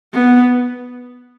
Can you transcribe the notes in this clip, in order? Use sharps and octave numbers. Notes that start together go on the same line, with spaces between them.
B3